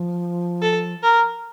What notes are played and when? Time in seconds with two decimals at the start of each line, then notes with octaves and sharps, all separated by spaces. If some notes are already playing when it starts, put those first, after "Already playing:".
Already playing: F3
0.62 A4
1.03 A#4